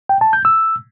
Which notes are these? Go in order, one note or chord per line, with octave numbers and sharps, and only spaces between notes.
G5
A5
G6
E6